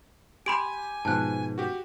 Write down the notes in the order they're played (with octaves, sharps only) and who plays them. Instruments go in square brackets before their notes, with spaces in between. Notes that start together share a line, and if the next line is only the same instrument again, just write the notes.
[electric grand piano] G4 [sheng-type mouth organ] G#5 [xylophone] B5 C6 D7
[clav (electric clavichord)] G#2 B2 F3 [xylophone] A5 F#6
[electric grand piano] F#4 G4